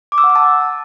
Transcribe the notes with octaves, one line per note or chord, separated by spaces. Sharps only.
D6
E6
F#5
E6
A5